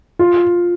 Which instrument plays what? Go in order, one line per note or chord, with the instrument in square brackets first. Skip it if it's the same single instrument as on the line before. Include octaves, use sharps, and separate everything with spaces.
[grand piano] F4